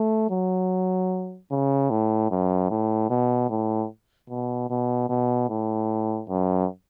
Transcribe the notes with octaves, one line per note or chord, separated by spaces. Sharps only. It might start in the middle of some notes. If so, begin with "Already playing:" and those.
Already playing: A3
F#3
C#3
A2
F#2
A2
B2
A2
B2
B2
B2
A2
F#2